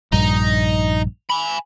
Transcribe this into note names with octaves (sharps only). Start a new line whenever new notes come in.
A#1 G2 D#4
G#5 B5